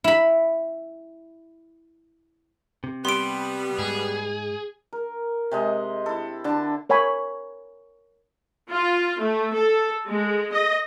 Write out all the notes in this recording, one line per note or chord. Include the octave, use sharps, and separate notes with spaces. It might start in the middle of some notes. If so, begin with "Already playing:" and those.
E4 B5
C3
G3 B3 C6 D7
G#2 G#4
A#4
C3 G#3 D#5
E4 A4
D3 D4 A5
A#4 C#5 F#5 G#5 B5
F4
A3
A4
G#3
D#5